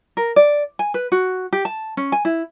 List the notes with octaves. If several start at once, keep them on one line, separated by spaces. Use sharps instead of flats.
A#4
D5
G#5
B4
F#4
G4
A5
C#4
G#5
E4